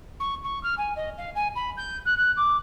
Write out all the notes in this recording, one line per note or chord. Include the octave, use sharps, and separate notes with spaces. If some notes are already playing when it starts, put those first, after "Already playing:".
C#6
C#6
F6
G#5
D#5
F5
G#5
B5
G6
F#6
F#6
D6